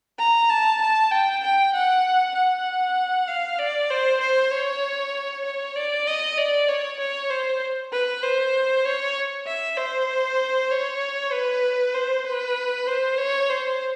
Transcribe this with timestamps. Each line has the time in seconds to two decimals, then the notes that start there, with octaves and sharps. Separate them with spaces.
0.19 A#5
0.50 A5
0.81 A5
1.11 G5
1.43 G5
1.74 F#5
2.35 F#5
3.28 F5
3.59 D5
3.90 C5
4.20 C5
4.51 C#5
5.45 C#5
5.75 D5
6.07 D#5
6.37 D5
6.68 C#5
6.99 C#5
7.30 C5
7.92 B4
8.23 C5
8.85 C#5
9.46 E5
9.77 C5
10.71 C#5
11.32 B4
11.94 C5
12.24 B4
12.87 C5
13.18 C#5
13.49 C5